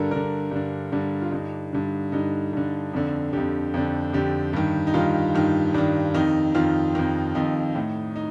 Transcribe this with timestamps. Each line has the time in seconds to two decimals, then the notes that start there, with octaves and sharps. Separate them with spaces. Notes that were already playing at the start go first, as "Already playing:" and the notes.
Already playing: G2 D3 A4 A#4
0.11 G2 D3 A#4
0.51 G2 D3
0.92 G2 D3
1.22 F4
1.32 G2 D3 D#4
1.73 G2 D3
2.12 G2 D3 D#4
2.53 G2 D3
2.93 F2 D3
3.33 F2 D3 G4
3.74 F2 D3
4.13 F2 D3 G4
4.53 G2 D#3
4.87 D#4
4.94 G2 D#3 F4
5.35 G2 D#3
5.74 G2 D#3 D4
6.14 F2 D#3 D#4
6.55 F2 D#3 F4
6.95 F2 D#3
7.35 F2 D#3 D#4
7.75 A2
8.16 D#4